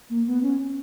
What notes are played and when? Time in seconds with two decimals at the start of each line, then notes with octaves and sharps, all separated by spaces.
0.10 A#3
0.27 B3
0.43 C#4